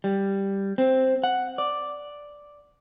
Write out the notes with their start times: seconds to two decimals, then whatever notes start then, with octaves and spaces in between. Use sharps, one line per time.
0.04 G3
0.78 C4
1.24 F#5
1.58 D5